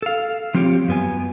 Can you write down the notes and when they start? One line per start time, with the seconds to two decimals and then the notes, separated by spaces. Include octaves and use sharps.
0.02 A4 F5
0.54 F3 C4 F4 G4 C#5
0.88 F#2 B3 G#5